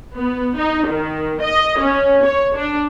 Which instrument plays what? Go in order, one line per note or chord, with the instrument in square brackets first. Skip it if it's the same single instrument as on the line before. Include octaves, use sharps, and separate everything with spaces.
[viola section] B3
D#4
D#3
D#5
C#4
C#5
D4